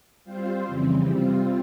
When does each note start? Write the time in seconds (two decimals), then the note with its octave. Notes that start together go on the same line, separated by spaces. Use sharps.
0.24 G3 C4 F4 C5
0.67 F2 C#3 E3 G3 C4
1.09 C3 G3 C4 F4